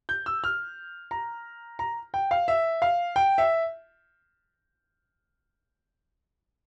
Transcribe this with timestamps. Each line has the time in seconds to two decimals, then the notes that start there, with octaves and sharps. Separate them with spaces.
0.09 G6
0.26 E6
0.44 F6
1.11 A#5
1.79 A#5
2.14 G5
2.31 F5
2.48 E5
2.82 F5
3.16 G5
3.38 E5